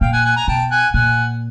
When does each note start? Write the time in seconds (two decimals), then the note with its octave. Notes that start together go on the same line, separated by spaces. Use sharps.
0.01 A#2 F5 G5
0.13 F#5 G#5
0.25 F#5 G#5
0.36 G#5 A#5
0.48 B2 G5 A5
0.71 F#5 G#5
0.93 A#2 F#5 G#5